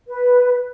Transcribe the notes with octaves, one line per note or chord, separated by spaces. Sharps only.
B4